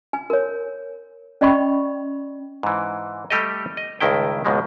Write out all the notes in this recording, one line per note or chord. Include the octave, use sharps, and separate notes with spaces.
G#5
A#4 C#5
C#4 D5 D#5 G5 B5 C#6
G#2 E3
G3 A3 G4 A4 D#5
D#5
C#2 G2 D#3 E4 G5
C#2 G#2 B2 F3 G#3 A#3